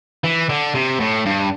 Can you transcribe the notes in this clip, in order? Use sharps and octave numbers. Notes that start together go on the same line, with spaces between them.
E3
D3
C3
A2
G2